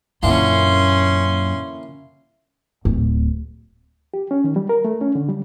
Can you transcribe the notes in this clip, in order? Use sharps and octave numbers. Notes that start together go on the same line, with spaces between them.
F#2 A#2 D3 E3 A#3 C#4 C6
D1
G4
C#4
D#3
G3
A#4
A3
C#4
D3
G3